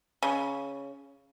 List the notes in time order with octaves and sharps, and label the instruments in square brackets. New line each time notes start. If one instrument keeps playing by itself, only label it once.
[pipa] C#3